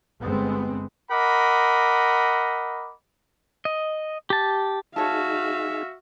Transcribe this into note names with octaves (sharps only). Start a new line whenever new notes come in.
G1 G#3 B3 C4
A#4 D#5 F#5 B5 D6
D#5
G4 A5
D#4 F#4 G#4 C#5 E5 F5 A5